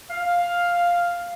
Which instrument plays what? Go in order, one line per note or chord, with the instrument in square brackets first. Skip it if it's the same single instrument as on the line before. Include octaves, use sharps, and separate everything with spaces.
[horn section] F5